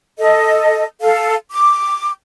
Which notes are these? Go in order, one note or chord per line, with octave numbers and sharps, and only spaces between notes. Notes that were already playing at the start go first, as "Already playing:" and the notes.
A4 D#5
A4 F5
D6